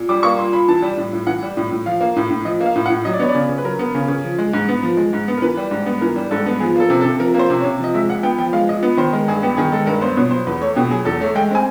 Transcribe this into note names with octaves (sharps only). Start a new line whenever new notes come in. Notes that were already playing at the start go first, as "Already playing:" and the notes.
Already playing: A#2
G3 D6
A#3 C#6
A#2 C6
A#2 B5
E3 A5
G3
A2
A2
E3 F#5
G3
A2
A2
F3 F5
A#3
A2
A2
F3 D#5
A#3
F5
A2
F#5
A2
F#3 D#5
D5
B3 C#5
D5
C#3
C#3
B4
F#3 A#4
B3
C#3
C#3
F3
G#3
G#2
B3
F3
G#3
G#2
B3
A#4
E3 B4
G3
G#2
B3
E3 A#4
G3
G#2 A4
B3
F3 G#4
A#3 A4
C3
A4
C3
F3 A#4
A#3
C5
C3
C#5
C3
F3 D#5
G#3 E5
A#2 F#5
B3 G5
F3 G5
G#3 F5
A#2 D#5
B3
D#3 C5
G#3 A#4
G2 G#4
B3 G4
D#3 G#4
G#3 A4
G2 A#4
B3 C5
B2 C#5
F#3 C5
E2 B4
A3 C#5
B2 G4
F#3 G#4
E2 A4
A3 C#5
G#3 G5
C4 G#5